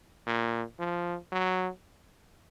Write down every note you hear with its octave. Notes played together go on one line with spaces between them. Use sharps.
A#2
F3
F#3